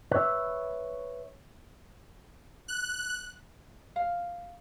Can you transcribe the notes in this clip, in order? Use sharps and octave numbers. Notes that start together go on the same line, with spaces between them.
B4 C#5 E5
F#6
F5